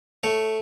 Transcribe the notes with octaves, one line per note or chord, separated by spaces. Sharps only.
A3 C#5